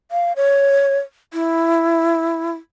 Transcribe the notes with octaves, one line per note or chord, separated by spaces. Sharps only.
F5
C#5
E4